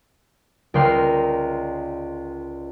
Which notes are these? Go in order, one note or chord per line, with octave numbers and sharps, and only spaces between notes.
C#2 A#4 D5 G5 C6 F6